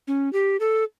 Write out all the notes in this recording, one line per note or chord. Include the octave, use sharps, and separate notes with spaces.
C#4
G4
A4